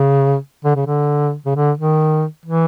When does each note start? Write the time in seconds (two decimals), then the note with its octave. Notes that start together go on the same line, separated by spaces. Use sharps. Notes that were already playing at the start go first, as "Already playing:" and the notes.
Already playing: C#3
0.65 D3
0.76 C#3
0.87 D3
1.46 C#3
1.56 D3
1.77 D#3
2.45 E3